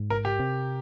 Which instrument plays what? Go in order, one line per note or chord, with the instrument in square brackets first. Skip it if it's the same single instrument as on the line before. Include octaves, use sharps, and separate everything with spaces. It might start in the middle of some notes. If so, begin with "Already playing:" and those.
Already playing: [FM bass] G#2
[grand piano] A#4
G4
[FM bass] C3